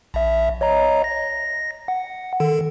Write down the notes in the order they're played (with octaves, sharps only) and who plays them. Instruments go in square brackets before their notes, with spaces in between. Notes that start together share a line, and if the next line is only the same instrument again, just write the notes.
[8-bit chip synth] A#1 E5
C#5 D#5 A#5
A#6
F#5
D#3 A4